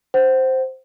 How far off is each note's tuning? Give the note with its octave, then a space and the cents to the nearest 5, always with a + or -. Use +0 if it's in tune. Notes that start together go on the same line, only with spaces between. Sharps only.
C5 +0 F#5 +30